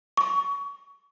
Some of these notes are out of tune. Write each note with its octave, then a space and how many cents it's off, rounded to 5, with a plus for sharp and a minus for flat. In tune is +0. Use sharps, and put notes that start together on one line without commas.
C#6 +25